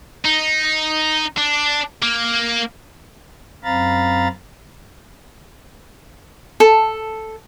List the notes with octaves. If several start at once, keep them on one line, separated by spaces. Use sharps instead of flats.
D#4
D4
A#3
F#2 C4 F5 A#5 B5 A6
A4